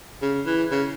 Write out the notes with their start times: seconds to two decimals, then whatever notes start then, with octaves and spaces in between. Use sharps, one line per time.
0.22 C#3
0.46 E3
0.71 C#3